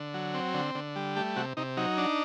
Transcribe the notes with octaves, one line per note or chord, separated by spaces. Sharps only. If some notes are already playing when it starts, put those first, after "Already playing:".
Already playing: D3
F#3
C4
D3
D3
G3
A3 G4
C3 F#4
C3 D#4
F#3 D#4
D4